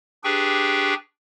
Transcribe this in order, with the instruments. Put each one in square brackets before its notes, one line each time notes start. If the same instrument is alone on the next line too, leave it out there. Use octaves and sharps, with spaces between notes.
[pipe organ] D4 G4 G#4 B4 G5 C#6